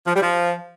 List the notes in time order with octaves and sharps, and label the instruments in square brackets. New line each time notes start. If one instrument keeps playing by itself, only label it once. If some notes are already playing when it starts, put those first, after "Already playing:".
[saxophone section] F3
G3
F3